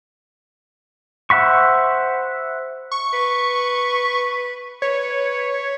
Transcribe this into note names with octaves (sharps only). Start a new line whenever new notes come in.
C5 E5 F#5 B5 C#6
C#6
B4
B4 C#5